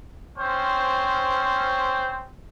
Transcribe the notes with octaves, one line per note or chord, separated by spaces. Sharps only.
C4 C#4 C5